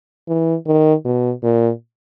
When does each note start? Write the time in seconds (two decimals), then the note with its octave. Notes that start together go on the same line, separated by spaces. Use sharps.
0.28 E3
0.67 D#3
1.05 B2
1.43 A#2